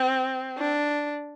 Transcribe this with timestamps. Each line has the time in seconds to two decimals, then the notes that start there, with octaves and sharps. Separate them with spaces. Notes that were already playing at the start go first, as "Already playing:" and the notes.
Already playing: C4
0.58 D4